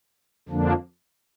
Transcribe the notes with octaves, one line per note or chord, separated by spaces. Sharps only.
F2 D3 F3 A#3 D4